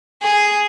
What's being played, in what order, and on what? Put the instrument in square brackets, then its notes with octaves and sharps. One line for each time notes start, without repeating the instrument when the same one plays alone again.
[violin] G#4